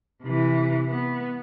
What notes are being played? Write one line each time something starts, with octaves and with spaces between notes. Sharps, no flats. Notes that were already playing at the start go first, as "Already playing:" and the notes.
C3 E3
B3